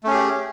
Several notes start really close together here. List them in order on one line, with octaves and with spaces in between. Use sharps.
A3 C#4 G#4 G4